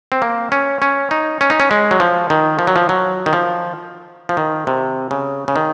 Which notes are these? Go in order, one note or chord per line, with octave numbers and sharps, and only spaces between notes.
C4
A#3
C#4
C#4
D#4
C#4
D#4
C#4
G#3
F#3
F3
D#3
F3
F#3
F3
F#3
D#3
F3
F3
D#3
C3
C#3
C#3
D#3